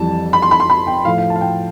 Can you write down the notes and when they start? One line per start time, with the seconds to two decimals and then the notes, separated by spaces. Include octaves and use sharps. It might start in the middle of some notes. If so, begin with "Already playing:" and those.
Already playing: F2 E3 G3 A5
0.33 B5
0.42 C6
0.51 B5
0.60 C6
0.70 B5
0.87 G5
1.05 A2 F3 A3 F5
1.18 F5
1.30 A5
1.36 F5
1.41 G5